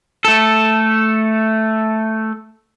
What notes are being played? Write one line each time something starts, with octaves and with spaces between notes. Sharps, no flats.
A3 A4